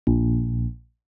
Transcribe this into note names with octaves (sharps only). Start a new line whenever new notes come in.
A#1